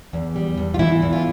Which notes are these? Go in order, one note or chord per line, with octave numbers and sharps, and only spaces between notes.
E2
G3
E2
F4
E3 E4
E2
F4